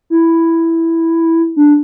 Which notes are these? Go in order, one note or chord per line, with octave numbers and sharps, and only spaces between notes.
E4
D4